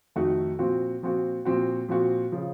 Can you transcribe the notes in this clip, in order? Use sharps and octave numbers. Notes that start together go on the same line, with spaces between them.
F2 D#3 A3 D#4 F#4
A#2 F3 C4 F#4
A#2 F3 C4 F#4
A#2 F3 C4 F#4
A#2 F3 C4 F#4
C#3 F3